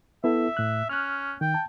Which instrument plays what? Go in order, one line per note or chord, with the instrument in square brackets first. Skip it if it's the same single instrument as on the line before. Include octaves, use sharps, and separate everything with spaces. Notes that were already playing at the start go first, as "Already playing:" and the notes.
[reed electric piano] B3 E4 A4 [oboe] E5
[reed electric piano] A2 F#6
[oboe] C#4 [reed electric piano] F6 F#6
[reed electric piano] D#3 [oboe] G5
[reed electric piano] A5